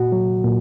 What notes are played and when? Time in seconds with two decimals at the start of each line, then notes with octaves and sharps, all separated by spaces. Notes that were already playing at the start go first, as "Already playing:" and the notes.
Already playing: A#2 F#4
0.12 F#3
0.44 A#2